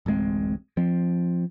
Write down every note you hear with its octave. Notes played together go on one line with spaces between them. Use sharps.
D1 A1 G#3 C4
F3 C4